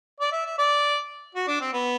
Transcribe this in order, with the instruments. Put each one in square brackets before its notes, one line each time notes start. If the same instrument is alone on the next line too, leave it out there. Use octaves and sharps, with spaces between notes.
[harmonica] D5
E5
E5
D5
F#4
D4
C4
B3